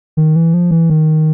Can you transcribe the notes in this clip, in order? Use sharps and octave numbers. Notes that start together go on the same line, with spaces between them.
D#3
E3
F3
E3
D#3